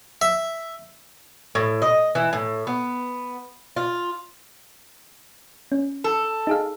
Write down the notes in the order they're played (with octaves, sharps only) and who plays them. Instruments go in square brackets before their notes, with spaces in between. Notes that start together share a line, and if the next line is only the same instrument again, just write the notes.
[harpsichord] E5
[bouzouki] A2
D#5
E3
A2
B3
F4
[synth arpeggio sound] C#4
[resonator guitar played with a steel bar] A4
[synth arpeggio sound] D#4 G#4 F5